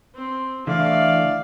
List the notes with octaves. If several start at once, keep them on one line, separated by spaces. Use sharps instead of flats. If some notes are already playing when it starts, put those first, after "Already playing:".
C4
D3 E3 A3 D5 F5